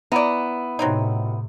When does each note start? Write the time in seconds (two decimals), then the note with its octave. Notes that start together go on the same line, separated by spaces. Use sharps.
0.12 B3 E4 D5 A#5
0.79 A2 C3 F#3 C4 D#4